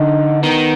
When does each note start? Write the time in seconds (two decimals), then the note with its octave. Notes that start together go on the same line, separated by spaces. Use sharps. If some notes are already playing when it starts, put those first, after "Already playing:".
Already playing: D3 D#4
0.43 D#3 B3